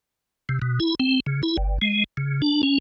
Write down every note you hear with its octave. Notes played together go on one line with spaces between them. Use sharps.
C3
B2
E4
C4
C#3
E4
G1
G#3
C#3
D4
C#4